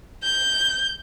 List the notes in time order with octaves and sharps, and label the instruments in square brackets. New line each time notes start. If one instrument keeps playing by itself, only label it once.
[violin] G6